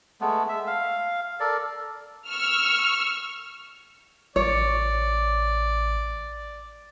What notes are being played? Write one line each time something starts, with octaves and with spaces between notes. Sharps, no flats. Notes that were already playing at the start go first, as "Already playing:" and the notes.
G#3 A3 B3
E5
F5
A4 A#4 D5
C#6 E6 F6
A1 C#5 D5